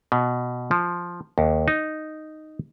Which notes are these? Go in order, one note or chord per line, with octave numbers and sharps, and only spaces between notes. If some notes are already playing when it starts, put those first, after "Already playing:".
B2
F3
D#2
D#4